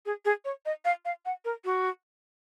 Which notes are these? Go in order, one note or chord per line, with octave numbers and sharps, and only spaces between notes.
G#4
G#4
C#5
D#5
F5
F5
F#5
A#4
F#4